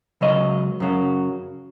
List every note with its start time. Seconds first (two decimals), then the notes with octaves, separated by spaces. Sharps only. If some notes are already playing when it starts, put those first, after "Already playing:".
0.21 C#2 C#3 F#3 D#5
0.80 F#2 C#3 F#3